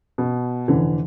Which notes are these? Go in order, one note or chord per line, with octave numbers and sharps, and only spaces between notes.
B2
F1 D3 E3